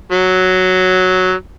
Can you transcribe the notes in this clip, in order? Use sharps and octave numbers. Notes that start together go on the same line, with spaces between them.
F#3